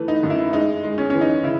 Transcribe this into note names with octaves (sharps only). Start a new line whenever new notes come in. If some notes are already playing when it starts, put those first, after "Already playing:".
Already playing: E3 A3 B4
D#4
F#2
E4
G#3 D#4
G#3
C#4
E3 C#4
D#4
C#3 E4